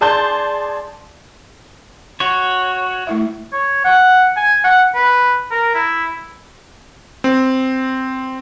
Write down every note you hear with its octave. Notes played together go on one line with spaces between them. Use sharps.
G#4 D5 A5 C6 G6
F#4 C#5
A3 E4 E5
C#5
F#5
G#5
F#5
B4
A#4
E4
C4